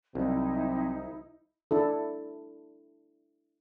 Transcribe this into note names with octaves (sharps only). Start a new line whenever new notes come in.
C2 C3 F#3 C4 D#4 E4
D4 E4 A4